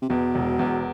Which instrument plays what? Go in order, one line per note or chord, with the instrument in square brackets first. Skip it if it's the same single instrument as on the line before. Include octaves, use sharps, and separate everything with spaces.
[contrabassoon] C3
[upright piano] E2 [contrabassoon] B2
[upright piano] E1
E2